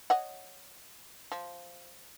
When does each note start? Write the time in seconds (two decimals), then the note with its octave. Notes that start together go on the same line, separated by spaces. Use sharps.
0.10 C#5 D#5 F#5
1.32 F3